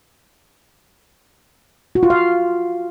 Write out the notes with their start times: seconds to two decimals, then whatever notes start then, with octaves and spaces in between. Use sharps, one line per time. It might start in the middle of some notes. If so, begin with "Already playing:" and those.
1.95 F#4
2.03 F4
2.10 F5